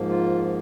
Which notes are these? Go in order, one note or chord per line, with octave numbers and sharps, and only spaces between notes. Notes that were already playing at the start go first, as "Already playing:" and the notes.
Already playing: G#2 F3 A#3
F4